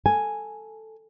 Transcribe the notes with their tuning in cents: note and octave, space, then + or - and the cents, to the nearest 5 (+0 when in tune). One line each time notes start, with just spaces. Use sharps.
A4 +5 G#5 +0